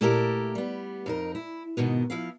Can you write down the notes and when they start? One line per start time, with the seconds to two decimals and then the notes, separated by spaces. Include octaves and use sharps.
0.01 A#2 A3 E4 G4 A4 A#4
0.55 G3 B3
1.06 F2 D#4 A#4
1.35 E4
1.77 G#2 B2 D#3 B3
2.10 F3 E4 F5